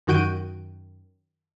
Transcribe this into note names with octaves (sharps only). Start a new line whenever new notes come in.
F#2 D#3 F#4 G6 D7 D#7